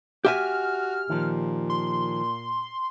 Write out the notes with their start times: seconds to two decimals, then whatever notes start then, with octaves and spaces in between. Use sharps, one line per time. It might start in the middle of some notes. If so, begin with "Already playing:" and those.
0.25 F#4 G4 E5 G#5 F6
1.10 A#2 D#3 F3
1.70 C6